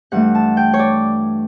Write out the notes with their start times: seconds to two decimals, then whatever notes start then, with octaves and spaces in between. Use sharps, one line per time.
0.12 G2 E3 A3 F#5
0.35 A5
0.57 G5
0.74 C#5
0.79 D5